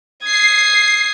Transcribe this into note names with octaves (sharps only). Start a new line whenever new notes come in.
D#6 G#6 C7